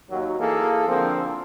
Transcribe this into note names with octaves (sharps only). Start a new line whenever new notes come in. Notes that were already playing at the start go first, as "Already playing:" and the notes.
D#2 F#3
E3 A#3 G#4 A4
D3 F3 A#3 C4